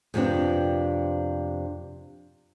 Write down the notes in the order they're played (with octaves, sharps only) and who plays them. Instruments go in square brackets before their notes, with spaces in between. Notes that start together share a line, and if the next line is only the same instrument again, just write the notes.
[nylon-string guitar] F2 C3 B3 C4 D4